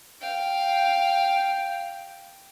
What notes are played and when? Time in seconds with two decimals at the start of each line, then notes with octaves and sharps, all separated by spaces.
0.21 F5 G5